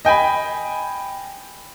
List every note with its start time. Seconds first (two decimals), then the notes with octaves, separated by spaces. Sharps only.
0.05 D#5 G5 G#5 B5